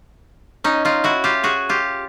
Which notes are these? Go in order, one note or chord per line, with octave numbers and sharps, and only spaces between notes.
C#4 D#4
D#4 F4
E4 F#4
F4 G4
F#4 G#4
F4 G4